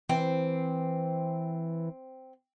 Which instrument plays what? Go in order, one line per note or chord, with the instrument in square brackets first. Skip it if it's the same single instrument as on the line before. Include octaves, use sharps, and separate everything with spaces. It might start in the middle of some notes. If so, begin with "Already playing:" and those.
[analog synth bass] E3 [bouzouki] C4